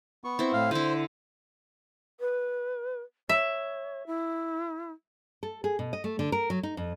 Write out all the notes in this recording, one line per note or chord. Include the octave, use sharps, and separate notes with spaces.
B3 C#6
C4 E4
A2 F5
D3 E4 C5
B4
C#5 E5
E4
A4
G#4
B2
D#5
A3
D3
A#4
F#3
D#4
F2